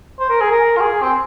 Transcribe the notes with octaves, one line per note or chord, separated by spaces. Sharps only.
C5
A#4
G#4
A#4
F4
G#4
C4